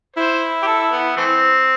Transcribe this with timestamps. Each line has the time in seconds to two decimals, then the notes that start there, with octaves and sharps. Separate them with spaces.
0.16 E4 C5
0.62 G4
0.67 A4
0.91 B3
1.17 E3 A3 C4